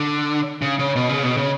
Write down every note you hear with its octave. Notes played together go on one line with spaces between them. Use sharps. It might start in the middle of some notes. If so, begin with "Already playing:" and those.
Already playing: D3
C#3
C#3
B2
C#3
B2
C#3